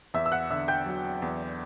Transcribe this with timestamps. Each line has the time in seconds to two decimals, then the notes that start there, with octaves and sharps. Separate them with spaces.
0.14 E2 E5 E6
0.26 E6
0.32 F#5 F#6
0.50 D3 E5 E6
0.68 G5 G6
0.86 F#3
1.22 E2